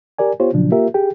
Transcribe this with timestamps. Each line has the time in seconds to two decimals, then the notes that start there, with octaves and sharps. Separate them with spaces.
0.19 G4 A#4 D5 G#5
0.40 B3 F4 G4 C5 C#5
0.53 A#2 C#3 F3 F#3 D4
0.71 A#3 F4 G4 A#4 E5
0.94 G4 G#4 G5